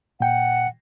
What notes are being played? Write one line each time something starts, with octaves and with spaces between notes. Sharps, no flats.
A#2 F#5 G5